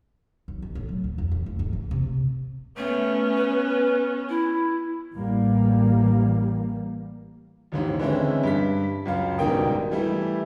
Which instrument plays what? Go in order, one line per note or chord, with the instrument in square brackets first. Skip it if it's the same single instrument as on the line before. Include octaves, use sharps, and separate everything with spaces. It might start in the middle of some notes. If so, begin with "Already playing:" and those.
[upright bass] B1
B2
A2
F#3
D2
F2
A2
F2
G#2
E3
C3
[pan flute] A3 [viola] B3 C#4
[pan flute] B4
E4
[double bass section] A1 A2 E3 G3 A#3
[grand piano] A1 D#2 G#2
D3 E3 G#3 C4 C#4 E4
G2 B6
C#2 F#2 F5
D#1 G#2 B2 A#4 G5 D#6
E3 G3 A3 E4